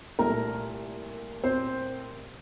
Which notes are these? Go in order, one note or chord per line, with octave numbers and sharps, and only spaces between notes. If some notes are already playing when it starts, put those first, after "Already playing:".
C2 A#2 A3 A#4 A#5
C4 C5